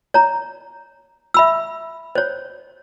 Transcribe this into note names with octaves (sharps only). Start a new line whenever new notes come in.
C#5 A#5
E5 B5 E6
C5 C#5